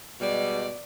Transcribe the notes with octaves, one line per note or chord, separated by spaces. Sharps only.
B2 G3 G#3 D5